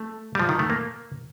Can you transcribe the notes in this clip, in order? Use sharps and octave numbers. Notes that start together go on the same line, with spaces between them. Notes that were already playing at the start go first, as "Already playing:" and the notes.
Already playing: A3
G3
F3
D#3
A3
A#3